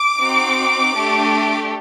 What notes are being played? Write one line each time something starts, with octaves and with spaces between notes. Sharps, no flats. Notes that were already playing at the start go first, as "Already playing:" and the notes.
Already playing: D6
C4 D#4 F#4
A3 D4 G4